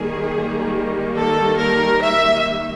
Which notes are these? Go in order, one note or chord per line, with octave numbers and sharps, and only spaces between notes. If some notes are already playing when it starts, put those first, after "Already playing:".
Already playing: D#3 G3 A#3 G#4
A4
A#4
E5